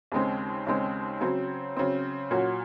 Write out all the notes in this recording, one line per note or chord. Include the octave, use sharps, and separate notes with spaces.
D#2 C#3 G#3 C4
D#2 C#3 G#3 C4
C#3 F#3 C4
C#3 F#3 C4
A#2 F#3 C#4 F#4